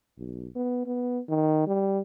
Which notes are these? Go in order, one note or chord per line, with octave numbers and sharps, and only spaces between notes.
B1
B3
B3
D#3
G3